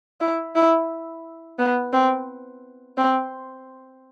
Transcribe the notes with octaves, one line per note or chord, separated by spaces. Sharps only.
E4
E4
B3
C4
C4